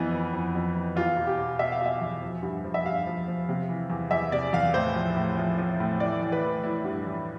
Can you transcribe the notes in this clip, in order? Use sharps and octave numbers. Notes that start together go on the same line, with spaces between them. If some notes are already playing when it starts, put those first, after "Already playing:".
Already playing: F2 E3 B3
E3
F2
F2
E3
E2 F4
B2
G4
B2
B2 E5
F5
B2 E5
E2
F3
G2
F3
E5
G2 F5
F3
F3
C3
E3
E2
E2 E5
C3 D5
E2 F5
A2 C5
F3
A2
F3
F3
A2
E3 D5
E3
B4
E3
E3 E4
G2
E3